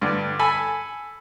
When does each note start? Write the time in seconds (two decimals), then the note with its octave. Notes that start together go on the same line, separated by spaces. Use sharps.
0.01 G2 D3
0.39 A4 G#5 B5